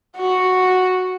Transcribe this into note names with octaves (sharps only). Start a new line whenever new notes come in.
F#4